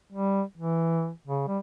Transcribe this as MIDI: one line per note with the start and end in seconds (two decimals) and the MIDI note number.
0.13 0.42 55
0.58 1.10 52
1.28 1.44 49
1.48 1.59 55